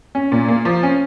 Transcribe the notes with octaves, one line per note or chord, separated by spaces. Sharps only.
C#4
A#2
A#3
F3
C#4